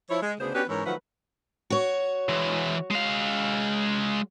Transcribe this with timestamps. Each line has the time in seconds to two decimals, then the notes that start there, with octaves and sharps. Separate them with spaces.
0.10 F3 E4 C#5
0.22 G#3
0.40 D2 C#3 B3 D4 G#4 C5
0.54 B3 C#4 D4 F#4 G4 B4
0.68 G#2 E3 C#4 E4 A#4 C#5
0.86 D#3 F3 F#3 A3 B4 F#5
1.70 F#4 C#5
2.29 E3 G#3
2.91 G#3 F5